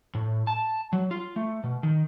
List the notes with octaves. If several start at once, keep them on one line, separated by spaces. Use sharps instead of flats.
A2
A5
F#3
F4
A3
B2
D#3